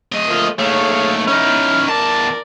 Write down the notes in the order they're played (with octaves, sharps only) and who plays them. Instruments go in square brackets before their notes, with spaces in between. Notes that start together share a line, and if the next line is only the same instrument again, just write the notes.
[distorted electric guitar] A3 D#5
[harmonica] F3 A#3
[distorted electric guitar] D#2 A3 [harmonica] G#4 C#5 F5
[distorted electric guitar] C#4 D#4 [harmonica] E4 F6
[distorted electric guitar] E2 A5 [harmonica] A#4 D5